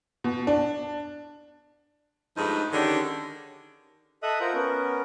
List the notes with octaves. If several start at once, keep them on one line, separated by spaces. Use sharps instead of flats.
B2
D4
G2 F3 G#3 A3 D#4
D3 D#3 C#4 D4 G4 G#4
A4 D#5 E5 D#6 F#6
F4 A#4 C5 F#5 A#5
B3 C#4 A#4